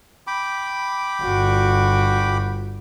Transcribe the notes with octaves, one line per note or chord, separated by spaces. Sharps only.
G5 B5 D6
G1 F#4